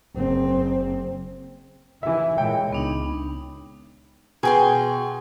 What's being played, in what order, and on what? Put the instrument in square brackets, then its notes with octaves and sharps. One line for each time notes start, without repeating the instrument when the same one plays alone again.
[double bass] F#1 C4
[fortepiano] E3 E5 [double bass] E4
[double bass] A#2 G#3 [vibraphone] C#5 [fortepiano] G5
[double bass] C#2 [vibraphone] B3 D4 D#4
[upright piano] B2 [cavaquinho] G#4 G5 C6